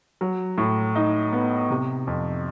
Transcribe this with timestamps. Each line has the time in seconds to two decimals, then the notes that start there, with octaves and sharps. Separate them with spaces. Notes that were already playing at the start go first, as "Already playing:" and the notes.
0.21 F#3
0.58 A2
0.96 D#4
1.33 B3
1.70 C3
2.07 F2